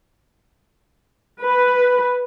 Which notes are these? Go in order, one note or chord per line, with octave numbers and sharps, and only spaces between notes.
B4